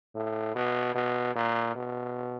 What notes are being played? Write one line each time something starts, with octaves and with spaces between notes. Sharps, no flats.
A2
B2
B2
A#2
B2